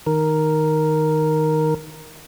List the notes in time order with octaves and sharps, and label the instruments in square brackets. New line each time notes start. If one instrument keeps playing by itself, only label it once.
[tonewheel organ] D#3 A#4